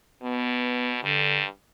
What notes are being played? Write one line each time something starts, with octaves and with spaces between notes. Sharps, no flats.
B2 B3
G2 D3